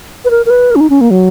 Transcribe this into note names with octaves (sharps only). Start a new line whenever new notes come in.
B4
A#4
A#4
B4
A#4
C#4
D#4
C#4
A#3
F#3